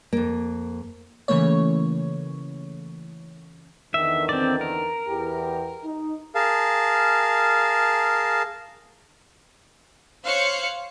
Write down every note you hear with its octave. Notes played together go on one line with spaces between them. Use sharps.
F2 A#3
C#3 E3 A3 A#3 C#5
E2 D3 D#3 E5
C4 D5
A#4
E2 G4
D#4
G#4 A#4 F5 A5
C5 C#5 F5 F#6 C#7